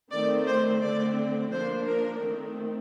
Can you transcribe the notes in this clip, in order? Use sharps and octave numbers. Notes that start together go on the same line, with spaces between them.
D#3 A3 C4 D5
C5
D3 A3 C4 D5
F3 A#3 D4 C5
A#4
D#3 A3 C4